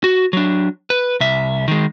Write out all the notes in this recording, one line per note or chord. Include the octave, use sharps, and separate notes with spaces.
F#4
F#3 D4
B4
C2 E5
D#3 G#3